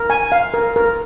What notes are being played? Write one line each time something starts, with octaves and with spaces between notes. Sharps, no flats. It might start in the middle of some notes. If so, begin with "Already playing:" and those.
Already playing: A#4
G#5
F5
A#4
A#4